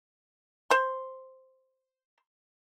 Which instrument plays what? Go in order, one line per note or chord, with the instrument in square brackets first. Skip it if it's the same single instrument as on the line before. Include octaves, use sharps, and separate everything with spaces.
[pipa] C5 C6